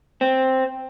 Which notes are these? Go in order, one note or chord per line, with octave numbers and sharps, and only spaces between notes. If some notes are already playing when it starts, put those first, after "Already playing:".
C4